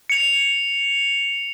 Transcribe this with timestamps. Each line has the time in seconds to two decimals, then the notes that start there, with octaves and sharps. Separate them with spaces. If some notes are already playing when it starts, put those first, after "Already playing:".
0.10 C#7 F7